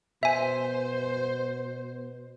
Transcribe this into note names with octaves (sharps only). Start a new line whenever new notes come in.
B2 C5 E5 G#5